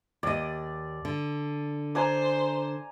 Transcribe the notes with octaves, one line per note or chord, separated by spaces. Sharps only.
D#2 D5 D#5
D3
C5 D5 G#5 A#5